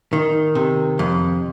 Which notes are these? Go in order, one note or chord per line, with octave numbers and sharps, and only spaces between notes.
D#3
C3
F2